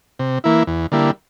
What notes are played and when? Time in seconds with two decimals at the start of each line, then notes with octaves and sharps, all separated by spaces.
0.19 C3
0.44 E3 A#3 E4
0.67 E2
0.92 D3 G3 A#3 E4